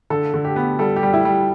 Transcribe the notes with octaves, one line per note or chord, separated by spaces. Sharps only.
D3 A4
D3
G4
B3
G3 A4
G4
G3
E4
G3